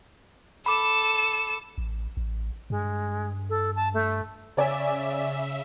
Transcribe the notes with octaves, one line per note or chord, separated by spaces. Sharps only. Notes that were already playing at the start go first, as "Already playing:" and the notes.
A4 B5 D6 E7
A1
A1
G2 G#3
A4
A5
A3
C#3 C#5 D5 E5 G#5